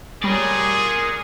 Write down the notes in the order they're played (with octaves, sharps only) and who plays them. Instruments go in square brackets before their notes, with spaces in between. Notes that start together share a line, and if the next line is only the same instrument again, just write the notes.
[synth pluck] G3 C#5 [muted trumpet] G#4 [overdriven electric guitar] A#4 D5